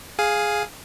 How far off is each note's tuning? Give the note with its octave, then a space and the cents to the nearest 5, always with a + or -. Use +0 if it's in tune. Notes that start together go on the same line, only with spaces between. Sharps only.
G#4 +0 F5 +5 G#5 +0